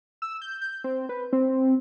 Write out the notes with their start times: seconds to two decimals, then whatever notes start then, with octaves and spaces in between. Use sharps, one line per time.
0.22 E6
0.42 G6
0.61 G6
0.84 C4
1.09 B4
1.33 C4